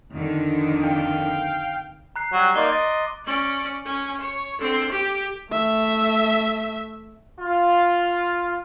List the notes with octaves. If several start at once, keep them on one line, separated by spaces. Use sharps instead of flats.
F2 D3 D#3
F5 G5
A#5 F#6 C7
F#3 G3
A#3 D#4 D5 C6 D6 G7
D#5 A6 D7
C#4 D5
C#4 G#5
C#5
D3 C4
G4
A3 E5
F4